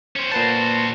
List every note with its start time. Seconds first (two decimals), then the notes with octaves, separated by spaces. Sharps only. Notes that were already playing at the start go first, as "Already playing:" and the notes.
0.16 C#4 C5
0.32 A#2 F#4 B4 C5 A5